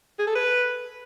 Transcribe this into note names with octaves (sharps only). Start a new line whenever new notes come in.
G#4
A4
B4